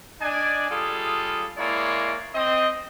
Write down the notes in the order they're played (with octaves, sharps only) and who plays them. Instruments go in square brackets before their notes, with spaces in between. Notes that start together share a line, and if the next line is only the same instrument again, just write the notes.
[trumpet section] D4 D5 D#5 G#5
G3 F4 G#4 A4 D#6
G#3 A#3 E4 C#5 D5
C4 D#5